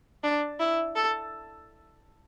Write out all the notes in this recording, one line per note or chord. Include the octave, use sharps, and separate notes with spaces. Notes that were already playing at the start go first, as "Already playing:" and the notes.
D4
E4
A4